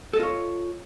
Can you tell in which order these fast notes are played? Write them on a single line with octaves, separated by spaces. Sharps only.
A4 D#5 F4 C#5